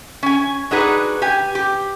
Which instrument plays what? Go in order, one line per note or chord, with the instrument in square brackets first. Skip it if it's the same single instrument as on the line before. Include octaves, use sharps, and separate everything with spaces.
[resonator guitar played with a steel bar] C#4 G#5
D4 D#4 F#4 G#4 B4
G4 G#5
G4